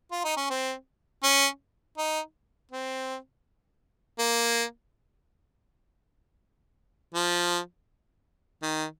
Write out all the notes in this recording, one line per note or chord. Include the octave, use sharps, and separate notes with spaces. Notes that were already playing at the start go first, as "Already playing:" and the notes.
F4
D#4
C#4
C4
C#4
D#4
C4
A#3
F3
D#3